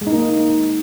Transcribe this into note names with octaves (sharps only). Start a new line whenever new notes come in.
G#3
D#4
A#3